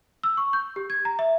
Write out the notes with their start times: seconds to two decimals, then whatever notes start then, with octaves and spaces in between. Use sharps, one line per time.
0.23 E6
0.37 C#6
0.53 G6
0.76 G4
0.90 G#6
1.05 A#5
1.19 E5